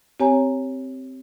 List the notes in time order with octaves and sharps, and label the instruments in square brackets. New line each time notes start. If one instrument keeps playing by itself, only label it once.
[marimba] C4 G4 C#5 G#5 A#5